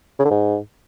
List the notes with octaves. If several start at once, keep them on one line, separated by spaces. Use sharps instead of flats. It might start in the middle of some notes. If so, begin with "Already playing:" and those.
C#3
D3
G#2